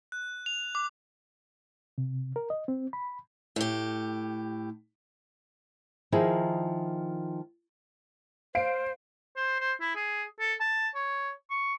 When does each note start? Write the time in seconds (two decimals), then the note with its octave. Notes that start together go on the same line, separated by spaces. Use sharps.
0.12 F#6
0.46 F7
0.75 D6
1.98 C3
2.36 A#4
2.50 D#5
2.68 C4
2.93 B5
3.56 A2 G4
6.12 D#3 F3 D#4 E4 G#4
8.55 C5 F5 C7 D7
9.37 C5
9.61 C5
9.81 E4
9.96 G#4
10.40 A4
10.61 A5
10.95 C#5
11.51 C#6